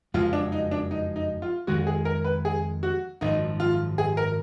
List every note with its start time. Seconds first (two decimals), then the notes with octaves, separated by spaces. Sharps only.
0.14 F#1 F2 F3 G#3 F4
0.33 D4
0.52 D#4
0.71 D4
0.91 D#4
1.16 D#4
1.42 F4
1.67 F2 D#3 G#3 F#4
1.87 G#4
2.05 A#4
2.24 B4
2.45 G#4
2.83 F#4
3.21 G#1 F#2 F3 D#4
3.60 F4
3.98 G#4
4.17 A#4